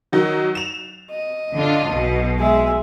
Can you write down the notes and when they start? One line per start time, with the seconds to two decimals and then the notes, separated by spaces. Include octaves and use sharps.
0.12 D#3 F#3 D#4
0.55 E7 F7
1.11 D#5
1.55 D3 D4 F4
1.89 B1 B2
2.38 G#3 E5